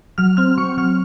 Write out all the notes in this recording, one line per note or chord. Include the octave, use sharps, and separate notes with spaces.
F#3 F6
C4 F6
F#3 C#6
F#3 F6